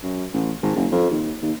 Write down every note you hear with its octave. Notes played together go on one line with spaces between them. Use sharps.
F#2
A1
G#1
F#1
F2
D#2
D#2